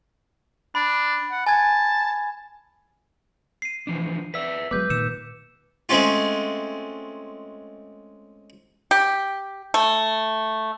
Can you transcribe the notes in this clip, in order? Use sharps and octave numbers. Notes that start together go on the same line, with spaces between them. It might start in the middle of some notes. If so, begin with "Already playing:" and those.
D4 B5
F#5
G#5 A5 G#6
C7 D#7
E3 F3 D4
B4 D5 E5 E6 B6
F#3 G#3 B3 B4 D6 G6
A#2 D#3 E6 C#7 E7
G#3 A3 C4 C#4 F4
G4
A3